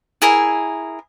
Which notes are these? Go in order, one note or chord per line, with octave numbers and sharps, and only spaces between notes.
E4 G#4 A#4 G#5